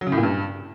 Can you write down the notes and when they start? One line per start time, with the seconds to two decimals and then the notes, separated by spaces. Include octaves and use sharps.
0.01 F#3
0.07 C#3
0.12 A2
0.18 A#2
0.23 G2